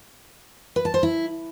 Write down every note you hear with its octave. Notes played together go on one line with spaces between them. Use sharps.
B4
A5
C5
E4